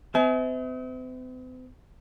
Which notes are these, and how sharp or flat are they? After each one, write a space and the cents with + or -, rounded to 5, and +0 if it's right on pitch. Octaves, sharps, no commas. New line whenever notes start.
C4 -45 E5 -35 G#5 +35